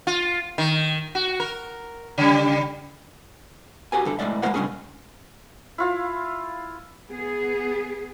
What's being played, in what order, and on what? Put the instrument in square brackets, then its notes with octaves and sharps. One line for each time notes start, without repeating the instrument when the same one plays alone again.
[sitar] F4
D#3
F#4
A#4
C#3 G3
[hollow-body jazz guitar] F#4 G4 A#4 G#5
G2 D3 A4
A2 G#3 B3 D5 E5
G#3 A#3 B3 D#4 A#4 F#5
C#3 G3 G#3 C#4 D4 G#4
[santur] E4 F4 F5
[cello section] B3 G#4